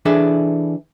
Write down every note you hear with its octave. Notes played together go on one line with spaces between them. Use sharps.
E3 D4 G#4 A4 E5